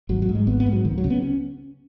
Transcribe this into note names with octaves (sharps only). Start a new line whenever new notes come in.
G#1 F#3
F#3
G#2
G#3
G#1 B3
B3
G#2
F#3
C#2 D#3
F#3
C#3
B3
C#4